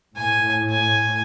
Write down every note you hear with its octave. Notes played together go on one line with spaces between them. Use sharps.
A2 G#5
G#5